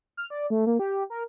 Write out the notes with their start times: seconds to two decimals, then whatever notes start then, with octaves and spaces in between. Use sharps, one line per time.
0.17 F6
0.30 D5
0.50 A3
0.67 A#3
0.79 G4
1.10 A#4